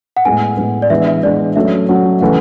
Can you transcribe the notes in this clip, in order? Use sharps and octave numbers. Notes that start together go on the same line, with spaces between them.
F#5
A2 G#3 B3 G#5
A2 G#3 B3
D5
E3 G#3 B3 D4 E5
E5
E3 G#3 B3 D4 D5
F#3 A3 C#4 F#4 E5
F#3 A3 C#4 F#4
C#3 E3 A3 F#5